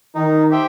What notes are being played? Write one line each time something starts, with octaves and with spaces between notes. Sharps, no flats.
D#3 D#4
G4 C5 E5 G5